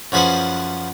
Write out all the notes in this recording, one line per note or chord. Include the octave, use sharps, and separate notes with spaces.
F#2 F3 G#4 B4 C5 F#5